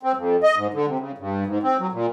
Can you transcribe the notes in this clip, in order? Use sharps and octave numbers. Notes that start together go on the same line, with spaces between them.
C4
F2
D#5
G#2
D3
C3
C#3
G2
G#2
C4
F#3
A#2